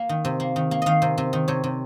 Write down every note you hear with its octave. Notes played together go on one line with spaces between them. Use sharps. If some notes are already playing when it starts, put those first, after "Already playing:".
Already playing: A#3
D#3
C3
A#3
D#3
A#3
D#3 D#5 F5
C3
C3
D#3
C3 C#5
C3